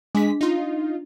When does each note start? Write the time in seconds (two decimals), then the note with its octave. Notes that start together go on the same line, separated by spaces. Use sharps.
0.15 G#3 D4 B6
0.41 D#4 F4